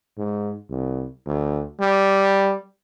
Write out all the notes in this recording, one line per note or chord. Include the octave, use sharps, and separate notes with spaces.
G#2
C2
D2
G3